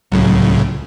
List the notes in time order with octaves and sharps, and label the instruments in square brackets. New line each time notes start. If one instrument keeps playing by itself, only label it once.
[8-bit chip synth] C#2 A2 C#3 [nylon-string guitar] F#3